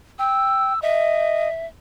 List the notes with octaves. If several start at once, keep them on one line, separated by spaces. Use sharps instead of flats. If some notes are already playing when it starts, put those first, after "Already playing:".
G5 E6
D#5 E5